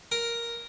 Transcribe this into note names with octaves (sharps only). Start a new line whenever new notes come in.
A#4